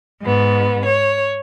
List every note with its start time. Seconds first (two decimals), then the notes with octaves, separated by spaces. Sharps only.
0.21 G#2 B3
0.85 C#5